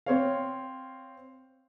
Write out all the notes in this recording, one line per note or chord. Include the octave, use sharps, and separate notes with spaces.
C4 C#5 F5